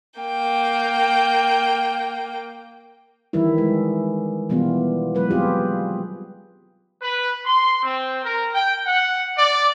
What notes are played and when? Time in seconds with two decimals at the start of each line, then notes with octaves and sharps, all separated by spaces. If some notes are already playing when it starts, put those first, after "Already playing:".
0.20 A#3 G5
3.33 D#3 E3 G3 E4
3.58 G#3
4.49 B2 E3 G3 B3 F4
5.15 F#3 G#3 B4
5.31 G3 C4 F4 G4 G#4
7.01 B4
7.46 C6
7.83 C4
8.24 A#4
8.54 G5
8.86 F#5
9.37 D5